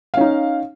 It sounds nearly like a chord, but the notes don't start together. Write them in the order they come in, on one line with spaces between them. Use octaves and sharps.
F5 C#4 D#4